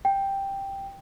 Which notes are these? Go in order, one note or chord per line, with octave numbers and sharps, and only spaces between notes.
G5